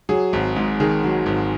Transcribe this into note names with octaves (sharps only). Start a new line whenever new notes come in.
F#3 G#4
G#1
G#2
D#3 G#4
F#3
G#1